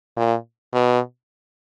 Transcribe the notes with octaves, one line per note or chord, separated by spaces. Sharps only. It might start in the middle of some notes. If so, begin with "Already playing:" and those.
A#2
B2